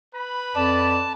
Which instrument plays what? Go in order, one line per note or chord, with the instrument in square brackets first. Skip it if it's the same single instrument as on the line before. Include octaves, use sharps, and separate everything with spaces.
[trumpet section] B4 B5
[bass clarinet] F2 [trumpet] D5 [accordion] A5